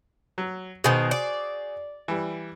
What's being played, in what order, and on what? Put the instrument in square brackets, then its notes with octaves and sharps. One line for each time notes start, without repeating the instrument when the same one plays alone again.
[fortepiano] F#3
[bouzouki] B2 D#3 [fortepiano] F#4 G#4 C5
[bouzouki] D5
[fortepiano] E3 G3